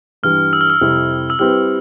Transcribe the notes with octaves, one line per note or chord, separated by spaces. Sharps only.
G2 E3 G3 F6
E6
F6
E6
F2 C3 G3 C4 E4
E6
G3 C4 E4 G4 B4 F6